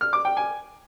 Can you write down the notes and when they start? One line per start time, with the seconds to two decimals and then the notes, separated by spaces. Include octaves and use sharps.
0.01 F6
0.13 D6
0.25 G5
0.37 G#5